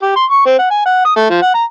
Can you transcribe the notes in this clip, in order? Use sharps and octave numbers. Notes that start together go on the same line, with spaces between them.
G4
C6
C#6
C4
F#5
G#5
F#5
D#6
A3
F3
F#5
A#5